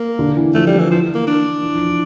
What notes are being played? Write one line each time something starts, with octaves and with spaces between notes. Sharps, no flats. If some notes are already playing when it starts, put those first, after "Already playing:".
Already playing: A#3
D3
E3
F3 A3
G3
E3
E3 F3
A#3
D4
E3
F3
E3